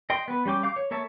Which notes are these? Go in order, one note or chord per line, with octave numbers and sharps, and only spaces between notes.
D#5 G5 C6
B3 B4
G3 C#4 G5 D6
F5 D6 G6
C#5
A#3 A4 C#5 E5 A5